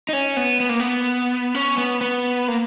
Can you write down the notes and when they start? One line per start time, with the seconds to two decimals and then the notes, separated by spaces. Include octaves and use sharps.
0.09 D#4
0.13 C#4
0.37 B3
0.60 B3
0.69 A#3
0.80 B3
1.55 C#4
1.78 B3
2.01 B3
2.48 A#3